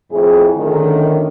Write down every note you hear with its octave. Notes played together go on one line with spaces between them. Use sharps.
F2 A2 E4 G#4
F#2 A2 D3 D#3